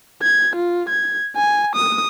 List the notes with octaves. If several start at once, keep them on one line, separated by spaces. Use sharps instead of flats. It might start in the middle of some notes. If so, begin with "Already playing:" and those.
G#6
F4
G#6
G#5
D#6